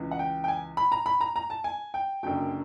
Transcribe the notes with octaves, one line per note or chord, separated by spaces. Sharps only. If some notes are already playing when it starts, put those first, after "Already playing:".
Already playing: C#2 C#3 E3
F#5
G5
G5
G#5
B5
A#5
B5
A#5
A#5
A5
G#5
G5
F#1 F#2 D3 F#3 G5